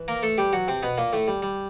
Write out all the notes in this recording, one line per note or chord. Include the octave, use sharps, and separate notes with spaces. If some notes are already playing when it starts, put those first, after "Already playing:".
Already playing: E3
A#3 A#4
A3 A4
G3 G4
F#3 F#4
C3 C4
B2 B3
A#2 A#3
A2 A3
G3
G3